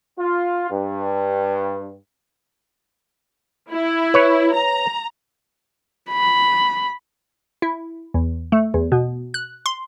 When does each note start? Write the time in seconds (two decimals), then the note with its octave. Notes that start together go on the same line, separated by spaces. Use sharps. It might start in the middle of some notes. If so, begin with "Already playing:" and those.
0.18 F4
0.70 G2
3.72 E4
4.14 B4 C#5
4.54 A#5
6.10 B5
7.62 E4
8.14 E2
8.52 A3
8.74 E2
8.92 B2
9.34 F#6
9.66 C6